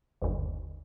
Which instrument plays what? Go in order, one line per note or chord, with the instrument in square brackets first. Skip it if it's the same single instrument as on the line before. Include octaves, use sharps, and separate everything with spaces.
[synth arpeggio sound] G1 D#2